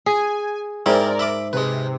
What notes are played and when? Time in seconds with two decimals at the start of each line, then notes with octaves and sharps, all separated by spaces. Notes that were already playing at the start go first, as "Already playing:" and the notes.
0.06 G#4 G#5
0.86 G#2 C4 E4 A#4 D5
1.19 E5 B5 D6
1.53 C3 G#3 B4